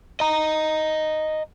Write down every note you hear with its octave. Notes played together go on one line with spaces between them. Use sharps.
D#5 A#5